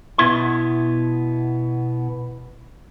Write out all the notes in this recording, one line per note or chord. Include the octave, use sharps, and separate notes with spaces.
B2 B3 E4 C6